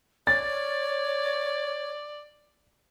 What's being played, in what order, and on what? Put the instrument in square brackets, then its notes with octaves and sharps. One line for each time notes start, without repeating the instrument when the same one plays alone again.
[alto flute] C#5 [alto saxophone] D5 [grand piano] A6